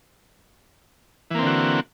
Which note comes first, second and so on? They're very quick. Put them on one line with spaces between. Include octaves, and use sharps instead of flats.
E3 A#3 C4 D3 F#4